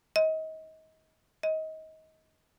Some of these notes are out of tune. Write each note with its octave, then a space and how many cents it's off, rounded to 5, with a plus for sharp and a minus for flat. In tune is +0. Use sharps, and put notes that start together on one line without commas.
D#5 +30
D#5 +25